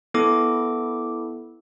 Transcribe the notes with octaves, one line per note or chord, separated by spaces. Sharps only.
B3 E4 A4 D6